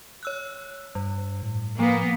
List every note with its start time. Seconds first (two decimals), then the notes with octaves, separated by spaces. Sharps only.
0.23 C#5 E6 F#6
0.95 G2 G3
1.43 A2
1.79 F3 A#3 B3